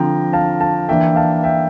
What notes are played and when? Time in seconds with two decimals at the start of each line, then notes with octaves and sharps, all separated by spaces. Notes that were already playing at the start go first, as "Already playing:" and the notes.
Already playing: D3 F3 C4 G5 A#5
0.33 F5 A5
0.61 F5 A5
0.89 E3 A#3 D4 E5 G5
1.16 F5 A5
1.43 E5 G5